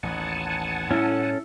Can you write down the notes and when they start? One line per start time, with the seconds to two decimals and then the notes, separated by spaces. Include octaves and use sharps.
0.03 A1 D#2 F#5 G#5 A5
0.91 A2 G3 C#4 E4 A4